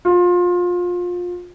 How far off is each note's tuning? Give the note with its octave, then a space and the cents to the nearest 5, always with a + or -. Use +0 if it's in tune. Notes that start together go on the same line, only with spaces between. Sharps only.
F4 +25